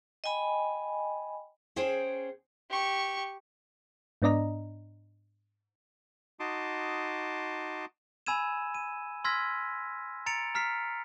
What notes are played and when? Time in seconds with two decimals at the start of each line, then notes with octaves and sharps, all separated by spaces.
0.24 D#5 G5 G#5 B5
1.76 C#4 G#4 C5 G5
2.70 G4 C#6
4.22 G#2 B3 D4 D5 D#5 A#5
6.40 D#4 F#4 A5 C6 D6 D#6
8.26 G#5 B5 E6 G#6 D#7 E7
8.74 D#7
9.24 C6 E6 F6 G#6 A#6 B6
10.26 A#5 A6 C#7 D7 F7
10.55 A#5 F6 B6 C7